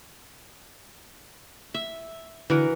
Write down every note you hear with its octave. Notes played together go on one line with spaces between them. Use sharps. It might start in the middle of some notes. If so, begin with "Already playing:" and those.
E5
D3 E3 F#4 A#4